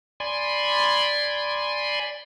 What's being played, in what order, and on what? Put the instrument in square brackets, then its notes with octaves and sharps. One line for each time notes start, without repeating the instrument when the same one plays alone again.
[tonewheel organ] D5 G#5 B5 C6